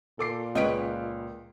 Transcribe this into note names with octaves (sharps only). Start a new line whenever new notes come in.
A#2 A4 D6 C7
C#2 B4 C#5 D#5 D7